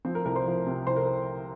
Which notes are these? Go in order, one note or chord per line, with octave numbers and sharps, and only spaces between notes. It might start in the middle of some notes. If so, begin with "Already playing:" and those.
F3 C4
A#4
C2 A#4
C5
F3
C3
C2 C5
A#4